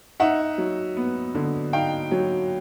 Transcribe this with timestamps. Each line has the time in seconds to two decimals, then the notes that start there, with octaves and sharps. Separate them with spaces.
0.20 D#4 E5 F#5
0.58 F#3
0.96 B3
1.35 D3
1.73 D#4 F5 G5
2.11 F#3